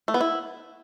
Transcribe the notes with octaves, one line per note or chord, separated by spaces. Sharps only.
A3
B3
E4